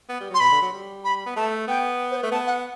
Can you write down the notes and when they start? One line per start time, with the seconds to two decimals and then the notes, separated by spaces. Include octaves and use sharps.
0.09 B3
0.20 G3
0.30 F#3 C6
0.40 B2 B5
0.51 D3
0.61 F#3
0.73 G3
1.05 B5
1.26 B3
1.36 A3 A5
1.68 B3 G5
2.11 C5
2.21 A3 B4
2.31 B3 A5
2.47 F#5